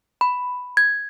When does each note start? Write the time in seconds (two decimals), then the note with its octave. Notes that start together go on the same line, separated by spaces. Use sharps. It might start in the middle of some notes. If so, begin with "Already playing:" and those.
0.21 B5
0.77 G#6